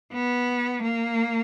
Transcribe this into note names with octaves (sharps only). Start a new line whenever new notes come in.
B3
A#3